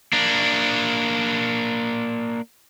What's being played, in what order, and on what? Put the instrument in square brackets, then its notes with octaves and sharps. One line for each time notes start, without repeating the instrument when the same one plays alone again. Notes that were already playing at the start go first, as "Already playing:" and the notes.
[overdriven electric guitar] A#3 D4